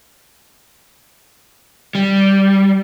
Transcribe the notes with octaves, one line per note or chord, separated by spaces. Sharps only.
G3